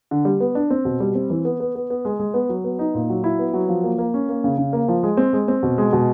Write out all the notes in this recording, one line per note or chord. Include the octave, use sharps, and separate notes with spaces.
D3
G3
B3
D4
C4
B2
G3
C4
E3
B3
B3
B3
B3
G#3
G#3
B3
F#3
B3
D#4
A#2
F#3
E4
B3
F#3
F3
A#3
A#3
C#4
A#3
C#3
C#3
A#3
F3
G#3
C4
G#3
C4
B2
G#3
B2